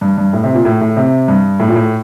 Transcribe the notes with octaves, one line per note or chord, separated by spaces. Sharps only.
G2
G2
A2
C3
A#2
A2
A2
C3
G2
A2
A#2
A2